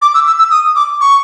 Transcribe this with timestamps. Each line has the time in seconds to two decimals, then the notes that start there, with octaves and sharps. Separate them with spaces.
0.02 D6
0.14 E6
0.27 E6
0.38 E6
0.51 D#6
0.76 D6
1.01 C#6